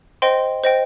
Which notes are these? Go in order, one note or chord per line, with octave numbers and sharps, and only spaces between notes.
C5 D#5 G5 C6
C5 D#5 G5